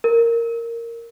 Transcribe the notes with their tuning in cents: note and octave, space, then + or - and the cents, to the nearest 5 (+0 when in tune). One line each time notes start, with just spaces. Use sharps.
A#4 -10